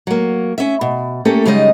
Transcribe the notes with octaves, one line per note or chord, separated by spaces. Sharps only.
F#3 A#3
C#4 E5
B2
A3 A#3 C#4 G4 A4
F#2 C#3 G3 G#3 D#4 D#5